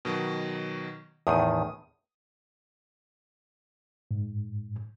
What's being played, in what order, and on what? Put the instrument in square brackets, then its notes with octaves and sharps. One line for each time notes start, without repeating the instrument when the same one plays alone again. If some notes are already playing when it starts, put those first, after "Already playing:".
[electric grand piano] B2 D#3 F#3
[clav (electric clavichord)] E2 A2 D#3 [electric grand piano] D#6 D#7
[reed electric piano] G#2